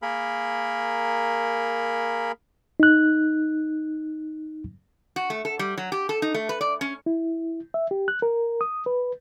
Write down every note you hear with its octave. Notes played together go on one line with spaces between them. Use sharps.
A#3 G#4 A#4 B5
D#4 F#6
F#4
A3
A4
G3
F#3
G4
A4
D#4
A3
B4
D5
C#4
E4
E5
G4
F#6
A#4
D#6
B4